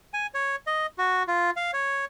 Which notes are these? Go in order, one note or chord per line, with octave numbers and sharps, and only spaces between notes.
G#5
C#5
D#5
F#4
F4
F5
C#5